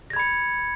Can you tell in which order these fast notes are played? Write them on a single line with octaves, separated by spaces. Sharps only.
A#6 G#6 B5 C#7